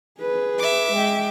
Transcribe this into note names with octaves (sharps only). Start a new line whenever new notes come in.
G#4 B4
E5 D6
G#3 G5